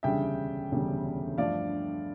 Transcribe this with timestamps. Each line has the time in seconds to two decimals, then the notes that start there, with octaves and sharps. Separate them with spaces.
0.03 E1 D2 C#3 G3 D4 E5 G5
0.71 E1 D2 C#3 G3 D4
1.38 G2 F3 A3 D5 F5